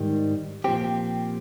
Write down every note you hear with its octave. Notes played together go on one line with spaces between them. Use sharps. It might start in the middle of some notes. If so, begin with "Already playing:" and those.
Already playing: G#2 D#3 G3
A#2 F3 C4 G4